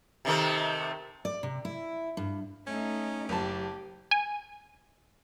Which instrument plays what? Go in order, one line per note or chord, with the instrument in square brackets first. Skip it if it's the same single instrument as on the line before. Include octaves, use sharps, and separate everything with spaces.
[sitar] C3 D#3 A3
[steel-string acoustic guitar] D5
C3
E4
G2
[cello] A3 D#4 [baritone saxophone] C#4
[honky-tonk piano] F#1 A5 [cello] G4
[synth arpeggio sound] G#5